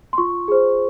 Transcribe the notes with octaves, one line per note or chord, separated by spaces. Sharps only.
C6
F4 C#6
G#4 C5